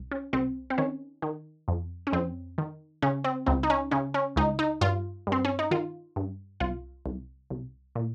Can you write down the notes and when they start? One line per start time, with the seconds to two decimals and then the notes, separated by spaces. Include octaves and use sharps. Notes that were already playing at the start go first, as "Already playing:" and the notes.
Already playing: C2
0.11 C#4
0.33 C2 C4
0.70 C4
0.78 D#3 C#4
1.22 D#3
1.68 F2
2.07 C#4
2.12 F2 C4
2.58 D#3
3.02 C#3 C#4
3.24 C4
3.46 C#2 C4
3.63 D#4
3.70 C#4
3.91 C#3 C#4
4.14 C#4
4.36 C#2 D#4
4.59 D#4
4.81 G2 F4
5.27 G2
5.32 C4
5.45 C#4
5.59 D#4
5.71 D#3 F4
6.16 G2
6.60 C2 F4
7.06 C2
7.50 C2
7.95 A#2